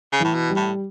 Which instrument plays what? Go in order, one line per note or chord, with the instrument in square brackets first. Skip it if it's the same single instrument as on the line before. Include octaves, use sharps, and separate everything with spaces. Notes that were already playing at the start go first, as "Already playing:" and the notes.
[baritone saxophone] C#3
[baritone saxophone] A2 [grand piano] E3
[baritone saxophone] B2
[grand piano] G3
[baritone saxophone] A2